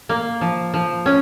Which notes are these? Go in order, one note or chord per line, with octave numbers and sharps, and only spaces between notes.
A#3
F3
F3
C#4